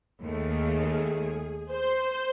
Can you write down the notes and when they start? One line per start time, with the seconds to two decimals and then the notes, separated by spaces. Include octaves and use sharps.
0.24 D#2 D#3 A3 G#4
1.72 C5